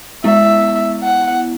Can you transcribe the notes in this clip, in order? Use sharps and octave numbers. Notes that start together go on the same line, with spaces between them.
G#3 B3 E4 E5
F#5